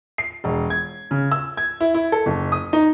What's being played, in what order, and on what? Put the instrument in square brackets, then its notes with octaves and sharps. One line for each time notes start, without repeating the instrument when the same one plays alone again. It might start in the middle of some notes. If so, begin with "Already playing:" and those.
[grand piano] C7
E1
G#6
C#3
E6
G#6
E4
E4
A4
F#1
D#6
D#4